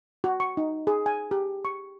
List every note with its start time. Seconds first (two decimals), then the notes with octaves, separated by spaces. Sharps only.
0.24 F#4
0.40 C#6
0.57 D#4
0.87 G#4
1.06 G#5
1.31 G4
1.65 C#6